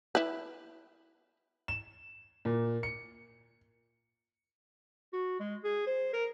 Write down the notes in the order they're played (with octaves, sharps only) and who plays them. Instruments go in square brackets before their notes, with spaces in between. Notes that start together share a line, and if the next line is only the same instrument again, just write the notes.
[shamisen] E4 B4
[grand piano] E7
A#2
C#7
[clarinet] F#4
G#3
G#4
C5
A#4